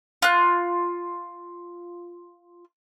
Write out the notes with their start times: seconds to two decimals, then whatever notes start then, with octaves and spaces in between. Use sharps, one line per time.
0.22 F4 F#6